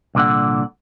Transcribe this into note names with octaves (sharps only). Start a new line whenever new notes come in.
C2 A#2 D3 F#5